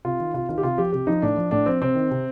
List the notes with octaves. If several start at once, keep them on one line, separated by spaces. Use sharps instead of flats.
C3 F4
D#3
C3 F4
D#3 F4
G4
C3 F4
F3 G4
C3 G4
F3 D#4
A2 D4
F3
A2 D4
F3 C4
C3 C4
D#3
C3